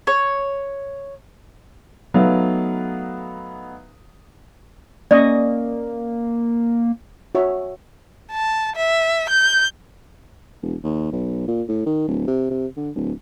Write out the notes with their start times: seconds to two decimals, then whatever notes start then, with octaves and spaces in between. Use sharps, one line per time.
0.07 C#5
2.14 F#3 A3 B3 D#4 E5 F5
5.11 A#3 C#4 D5 D#5 C#6
7.35 F#4 C#5 E5
8.32 A5
8.76 E5
9.30 G6
10.62 E1
10.83 D#2
11.12 B1
11.48 A#2
11.68 A2
11.86 D#3
12.08 D1
12.28 C3
12.50 C3
12.77 D3
12.95 D1